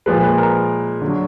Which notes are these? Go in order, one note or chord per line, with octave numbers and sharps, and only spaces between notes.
A#2 F3 G#3 B4
B4
A#4
D3 F#3